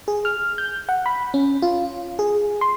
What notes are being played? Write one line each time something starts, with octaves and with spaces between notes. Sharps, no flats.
G#4
F6
G6
F#5
B5
C#4
F4
G#4
C6